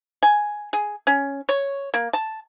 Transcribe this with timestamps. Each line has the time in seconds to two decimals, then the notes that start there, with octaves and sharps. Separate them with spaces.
0.23 G#5
0.73 G#4
1.07 C#4
1.49 C#5
1.94 A#3
2.13 A5